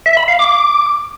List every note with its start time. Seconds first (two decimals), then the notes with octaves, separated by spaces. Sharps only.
0.06 E5
0.17 B5
0.28 F5
0.39 D6